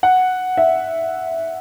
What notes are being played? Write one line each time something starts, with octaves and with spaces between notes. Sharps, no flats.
F#5
E5